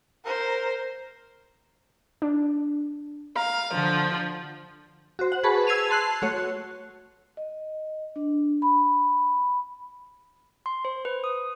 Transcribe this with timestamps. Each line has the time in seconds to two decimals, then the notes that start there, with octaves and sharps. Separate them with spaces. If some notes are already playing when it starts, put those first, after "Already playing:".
0.24 A#4 C5
2.22 D4
3.36 F5 A#5
3.73 D3 F3
5.19 F#4 C5
5.32 F#5
5.43 G#4 B4 A5 B5 C#6
5.67 E6 G#6 C7 D#7 F7
5.90 A5 C6 F#6 C7
6.22 A3 F#4 C#5
7.37 D#5
8.16 D4
8.62 B5
10.66 C6
10.85 C5
11.05 B4
11.24 D#6